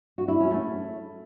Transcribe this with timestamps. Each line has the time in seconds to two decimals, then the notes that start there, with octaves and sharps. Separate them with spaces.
0.18 F#4
0.28 E4
0.40 C#4
0.51 A3